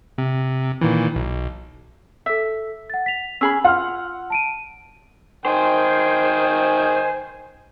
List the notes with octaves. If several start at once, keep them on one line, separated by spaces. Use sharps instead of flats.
C3
A#2 D#3 E3
B1
A4 E5 E6
F#5 A6
B6 F7
C#4 G#4 B5 E6
F4 F#5 F6
A5 D7 D#7
D#3 C5 G5 G#5